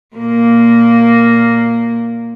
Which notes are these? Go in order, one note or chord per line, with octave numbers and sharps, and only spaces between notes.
A#2 A#3